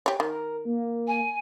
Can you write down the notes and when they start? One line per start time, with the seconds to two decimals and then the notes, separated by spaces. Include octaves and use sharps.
0.06 G4 C#5
0.20 D#3 A#4
0.65 A#3
1.07 G#5